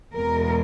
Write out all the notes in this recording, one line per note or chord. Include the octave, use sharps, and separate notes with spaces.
E2 B2 G#3 A#4